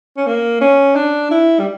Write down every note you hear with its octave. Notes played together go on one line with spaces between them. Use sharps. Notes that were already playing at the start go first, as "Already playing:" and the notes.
C#4
A#3
C#4
D4
E4
G3